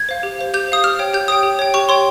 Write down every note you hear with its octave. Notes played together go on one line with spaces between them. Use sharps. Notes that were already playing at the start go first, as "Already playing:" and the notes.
Already playing: G#6
C5 F5
G4
C5 F5
G4 G6
C5 F5 D#6
G4 F6
C#5 G5
G4 G6
C#5 G5 D#6
G4
C#5 G5
G4 C#6
C#5 G5 C6